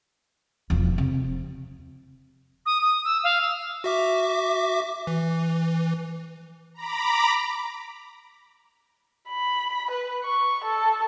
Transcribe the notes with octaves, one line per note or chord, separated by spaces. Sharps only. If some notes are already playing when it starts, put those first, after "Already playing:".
E1 F3
C3
D#6
D#6
E6
F5
E6
F#4 E5 D6
E3
A#5 B5 D6
B5
B4
C#6
A4